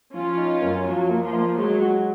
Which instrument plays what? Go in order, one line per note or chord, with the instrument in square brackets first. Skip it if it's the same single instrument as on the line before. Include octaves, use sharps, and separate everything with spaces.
[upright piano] F3 [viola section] C#4 F4
[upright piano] D#4
F#2
[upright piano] F3 [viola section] F#3
[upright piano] A#3
[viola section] F3
[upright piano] A#3
[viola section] F#3 [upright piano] G#3
[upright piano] F#4